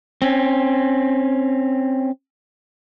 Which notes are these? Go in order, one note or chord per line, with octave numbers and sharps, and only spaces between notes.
C4 C#4